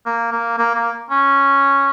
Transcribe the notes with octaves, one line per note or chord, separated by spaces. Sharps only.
A#3
A#3
A#3
A#3
C#4